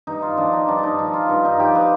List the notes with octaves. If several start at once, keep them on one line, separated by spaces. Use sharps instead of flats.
G2 D#4
F4
F3 D4
D#4
G2 D4
D4 D#4
F3 D#4
F4
G2
D#4
F3 G4
B4